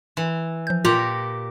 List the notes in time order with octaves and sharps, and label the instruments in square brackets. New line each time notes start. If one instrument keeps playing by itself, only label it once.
[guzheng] E3
[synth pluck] F3 G6
[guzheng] A#2 G4 A#5 [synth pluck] F4